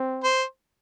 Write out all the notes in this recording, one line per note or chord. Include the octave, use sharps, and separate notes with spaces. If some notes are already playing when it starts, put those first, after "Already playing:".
Already playing: C4
C5